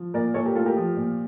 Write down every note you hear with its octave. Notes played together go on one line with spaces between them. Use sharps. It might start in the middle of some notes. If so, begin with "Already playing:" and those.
Already playing: F3
A#2 A#4 D5
A#2 A4 C#5
G4 A#4
A3 F4 A4
G4 A#4
F3
A#2